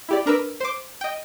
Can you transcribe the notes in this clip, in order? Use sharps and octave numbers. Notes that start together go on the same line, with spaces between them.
E4 G4 D5
D4 A#4 B4 E6
C5 D6
D#5 G5